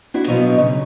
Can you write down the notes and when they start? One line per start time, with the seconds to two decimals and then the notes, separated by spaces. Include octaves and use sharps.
0.14 D4 E4 F#4
0.27 B2 F3 F#3 D#5
0.58 C#3